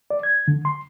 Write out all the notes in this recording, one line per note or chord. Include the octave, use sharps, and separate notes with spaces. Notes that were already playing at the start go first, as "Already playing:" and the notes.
D5
G#6
D3
C6